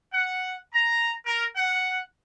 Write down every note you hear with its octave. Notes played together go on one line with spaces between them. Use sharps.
F#5
A#5
A#4
F#5